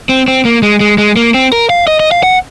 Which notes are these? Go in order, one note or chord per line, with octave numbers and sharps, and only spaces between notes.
C4
C4
A#3
G#3
G#3
G#3
A#3
C4
A#4
F5
D#5
D#5
F5
F#5